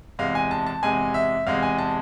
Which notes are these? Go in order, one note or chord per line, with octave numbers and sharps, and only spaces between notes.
E2 C3 G#3 F5
G#5
A5
A5
E2 C3 G#3 G#5
E5
E2 C3 G#3 F5
G#5
A5